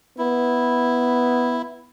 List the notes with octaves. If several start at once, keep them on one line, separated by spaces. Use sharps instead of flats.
B3 E4